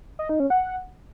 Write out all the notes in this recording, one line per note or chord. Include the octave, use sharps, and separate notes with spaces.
D#5
D#4
C#4
F#5